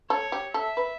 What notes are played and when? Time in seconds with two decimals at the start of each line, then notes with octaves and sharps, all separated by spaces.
0.10 A4 C#5
0.32 G4
0.54 A4 E5
0.77 B4